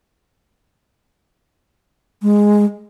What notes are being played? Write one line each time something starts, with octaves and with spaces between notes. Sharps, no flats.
G#3